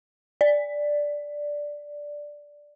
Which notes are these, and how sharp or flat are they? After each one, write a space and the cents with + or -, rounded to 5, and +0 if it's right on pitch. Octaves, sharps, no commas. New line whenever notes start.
D5 +0